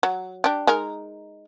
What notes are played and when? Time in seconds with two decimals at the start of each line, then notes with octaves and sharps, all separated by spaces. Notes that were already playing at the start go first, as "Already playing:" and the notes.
0.03 F#3
0.44 D4 G4
0.67 G#3 D#4 A#4